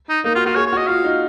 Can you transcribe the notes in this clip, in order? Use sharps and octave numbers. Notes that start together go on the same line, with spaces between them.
D#4
A#3 D#4
F4 F#4
F4 F#4
G#4 C#5
C#5
F#4
D#5
F4 F5
D#4